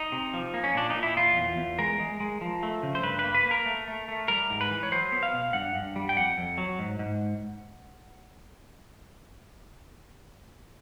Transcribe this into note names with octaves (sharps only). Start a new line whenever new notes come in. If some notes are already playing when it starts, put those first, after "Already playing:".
Already playing: D#4
C3
F3
A#3
C#4
A#2 D4
D#4
A#2
E4
E2 F4
E2
E2
G#3 A#4
G#3
G#3
F3
A3
C#3
C5
G2 B4
B4
A#3
B4
A#3
A#4
A3
A3
A3
G3 A#4
G#2
B4
E3
C#5
F#3 C5
B3
F5
B2
G2 F#5
G2
G3
G5
F2 F#5
F2
F#3
G#2
G#2